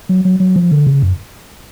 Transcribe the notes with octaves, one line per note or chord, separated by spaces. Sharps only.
F#3
F#3
F#3
F3
D3
C#3
F#2